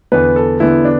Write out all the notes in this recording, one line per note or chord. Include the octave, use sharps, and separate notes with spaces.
E2 D3 B3 B4
A4
E2 D3 B3 E4
D4